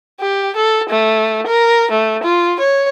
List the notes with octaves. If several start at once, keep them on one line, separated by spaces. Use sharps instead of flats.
G4
A4
A3
A#4
A3
F4
C#5